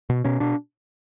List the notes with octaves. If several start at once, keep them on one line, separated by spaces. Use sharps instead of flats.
B2
B2 C#4
B2 D4